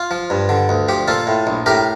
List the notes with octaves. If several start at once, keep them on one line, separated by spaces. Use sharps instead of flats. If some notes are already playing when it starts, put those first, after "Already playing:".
Already playing: F4
F3
G2
D3
D2
F3 G4
A#2 F4 A4
A2
A#1
A2 G4 A#4